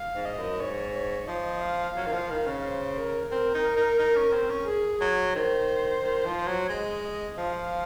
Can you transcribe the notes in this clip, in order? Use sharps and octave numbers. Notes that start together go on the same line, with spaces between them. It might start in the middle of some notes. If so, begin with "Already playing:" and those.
Already playing: F5
G#2
D#5
F#2
G#2 C#5
C#5
F3 D#5
F5
F#3
D#3
F3
D#3
C#3
C5
A#4
C4 A#4
D#4
D#4
D#4
C#4
C4
C#4
G#4
F#3
D#3 C5
D#3
F3
F#3
G#3 D#5
D#5
F3 F5